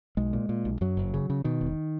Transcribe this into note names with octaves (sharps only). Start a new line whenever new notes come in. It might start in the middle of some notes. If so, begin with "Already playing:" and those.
B1 G#3
A#2
A#2
B1
F#2 F#3
F#1
C#3
C#3
B2 D#3
E1